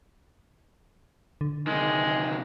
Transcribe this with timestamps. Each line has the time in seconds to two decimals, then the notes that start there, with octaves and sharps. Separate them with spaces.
1.41 D3
1.67 C3 D#3 G#3